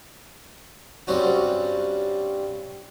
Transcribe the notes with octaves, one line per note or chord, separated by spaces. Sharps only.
G2 G3 C4 C#4 F#4